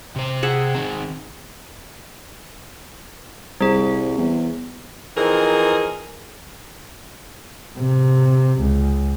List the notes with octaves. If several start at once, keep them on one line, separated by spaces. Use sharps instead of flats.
C3 C5
G#4 E5 F#5
D#3 C4
C2 G3 G#4
E2
E3 F3 C4 D#4 G#4 A#4
C3
C#2